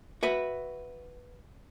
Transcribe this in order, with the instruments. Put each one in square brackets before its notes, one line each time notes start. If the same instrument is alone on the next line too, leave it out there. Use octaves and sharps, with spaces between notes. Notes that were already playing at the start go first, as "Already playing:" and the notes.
[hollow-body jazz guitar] F#4 B4 E5